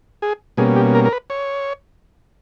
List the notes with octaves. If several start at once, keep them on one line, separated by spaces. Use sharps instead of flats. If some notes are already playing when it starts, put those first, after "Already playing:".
G#4
B2 G3 A#3 C#4 G#4
G4
A#4
A#4
B4
C#5